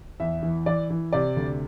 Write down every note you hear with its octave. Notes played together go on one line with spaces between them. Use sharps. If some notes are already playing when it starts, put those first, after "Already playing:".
E2 E5
E3
E3 D5
E3
C3 D5
D2